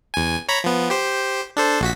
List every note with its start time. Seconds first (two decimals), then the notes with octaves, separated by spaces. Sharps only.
0.14 E2 G#5
0.49 C#5 A#5 B5
0.64 F3 B3
0.90 G4 C5
1.57 D4 A4 C5
1.81 A#1 F#4 B6